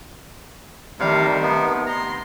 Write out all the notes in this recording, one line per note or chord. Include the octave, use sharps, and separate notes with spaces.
C3 D#3 G3 A3 F5
B3 D#4
A#5 C6